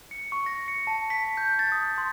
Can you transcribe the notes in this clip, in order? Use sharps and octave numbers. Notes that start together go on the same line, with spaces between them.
C#7
C#6
A#6
C#7
A5
B6
G6
A6
D#6
C6